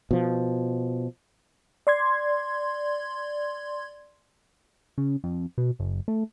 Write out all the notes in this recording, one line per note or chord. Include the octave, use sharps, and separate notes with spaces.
B2 F3
D5 C6 G#6
C#3
F2
B2
F#1
A3